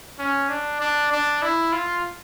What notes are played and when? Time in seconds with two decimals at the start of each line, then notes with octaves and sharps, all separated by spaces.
0.19 C#4
0.49 D4
0.80 D4
1.12 D4
1.42 E4
1.72 F4